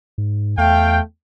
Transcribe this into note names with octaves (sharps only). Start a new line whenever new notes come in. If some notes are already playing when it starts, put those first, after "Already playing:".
G#2
E2 A3 F5 G5